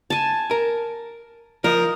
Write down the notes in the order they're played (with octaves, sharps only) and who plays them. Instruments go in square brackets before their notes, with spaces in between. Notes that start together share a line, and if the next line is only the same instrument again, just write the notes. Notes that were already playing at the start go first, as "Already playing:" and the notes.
[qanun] G#5 A5
[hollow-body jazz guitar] A#4
[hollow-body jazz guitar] F3 [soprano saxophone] A#4 [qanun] D#5